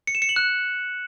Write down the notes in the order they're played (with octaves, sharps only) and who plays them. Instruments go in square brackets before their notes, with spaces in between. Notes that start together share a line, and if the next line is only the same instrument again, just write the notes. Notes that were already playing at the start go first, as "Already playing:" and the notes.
[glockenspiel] C#7
E7
C#7
F#7
F#6